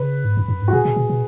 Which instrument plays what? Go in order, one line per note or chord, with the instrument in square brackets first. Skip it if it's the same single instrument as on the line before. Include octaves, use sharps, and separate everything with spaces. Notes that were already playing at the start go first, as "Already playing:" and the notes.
Already playing: [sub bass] C#3 [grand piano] B4
[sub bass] G#2
F#2
F#2
G#2
[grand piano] F#4
[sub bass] B2 [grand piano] G#4
[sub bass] B2
B2
B2